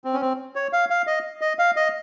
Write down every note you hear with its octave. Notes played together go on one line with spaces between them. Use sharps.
C4
C#4
C4
C#5
F5
F5
D#5
D#5
F5
D#5